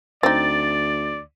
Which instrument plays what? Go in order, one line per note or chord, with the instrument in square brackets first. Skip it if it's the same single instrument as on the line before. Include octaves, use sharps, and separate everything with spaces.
[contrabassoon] D2 [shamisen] C4 D#4 [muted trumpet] D5 [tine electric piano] A6